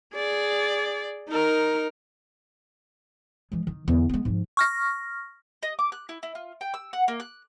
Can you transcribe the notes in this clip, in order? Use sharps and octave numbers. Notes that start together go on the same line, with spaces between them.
G#4 D5
D#4 A#4
E3 G#3
D#3
E2 D3
G#3 B3
G#2 F3
C#6 F6 A#6
D#5
D6
F#6
E4
E4
F4
G5
E6
F#5
A#3
F#6